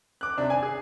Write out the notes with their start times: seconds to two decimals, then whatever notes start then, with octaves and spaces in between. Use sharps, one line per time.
0.21 D6 F#6
0.37 C3 D4
0.50 G#5
0.63 G#4